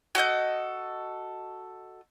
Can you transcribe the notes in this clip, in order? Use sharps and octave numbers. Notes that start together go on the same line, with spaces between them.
F#4 A4 D#5 G6